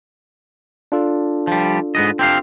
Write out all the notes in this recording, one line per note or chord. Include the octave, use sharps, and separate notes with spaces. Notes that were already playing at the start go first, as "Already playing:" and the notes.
D4 F4 A4
F3 G3
G#2 B3 D#5
C4 G4 F5